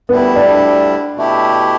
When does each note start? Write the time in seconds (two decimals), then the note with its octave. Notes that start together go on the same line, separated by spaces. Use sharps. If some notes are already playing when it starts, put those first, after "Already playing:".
0.09 D2 D3 G3 B3 E4
0.36 D4
1.16 B2 A3 E4 G4